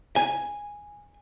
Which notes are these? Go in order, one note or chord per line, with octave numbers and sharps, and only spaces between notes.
G#5